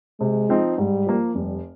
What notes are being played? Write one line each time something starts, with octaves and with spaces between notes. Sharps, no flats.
C3 G#3
F3 C4 D#4
G#2 G3
F3 A#3
F1 G3